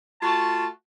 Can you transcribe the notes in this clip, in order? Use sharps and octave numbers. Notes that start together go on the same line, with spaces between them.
A3 F4 F#4 A5